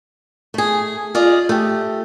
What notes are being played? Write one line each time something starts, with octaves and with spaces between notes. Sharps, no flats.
A3 G#4
F4 G#4 D5 D#5
A3 G4